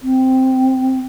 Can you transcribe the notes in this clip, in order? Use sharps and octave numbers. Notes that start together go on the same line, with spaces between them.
C4